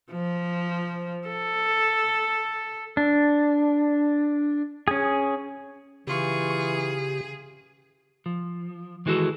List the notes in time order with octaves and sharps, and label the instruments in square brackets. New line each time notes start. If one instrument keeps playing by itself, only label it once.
[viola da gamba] F3
A4
[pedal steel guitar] D4
C#4 G#4
[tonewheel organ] C#3 G4 [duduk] E3 [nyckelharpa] F4 C#6 [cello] G#4
[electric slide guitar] F3
D#3 E3 G#3 F#4 A4